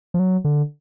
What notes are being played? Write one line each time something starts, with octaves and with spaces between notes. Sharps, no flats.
F3
F#3
D3